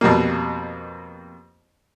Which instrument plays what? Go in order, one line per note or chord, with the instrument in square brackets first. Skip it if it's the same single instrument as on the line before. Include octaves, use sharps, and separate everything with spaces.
[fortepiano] F2 B2 G3 A#3